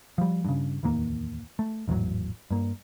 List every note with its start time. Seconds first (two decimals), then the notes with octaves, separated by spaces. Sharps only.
0.18 F3 G3
0.45 G2 C#3
0.83 D1 E2 D#3 A#3
1.59 A3
1.87 G#1 E2 A2 F#3
2.51 G2 A#3